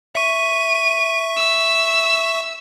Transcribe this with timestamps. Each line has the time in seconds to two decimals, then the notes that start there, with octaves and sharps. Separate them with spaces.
0.15 E5 C#6 D#7
1.36 E6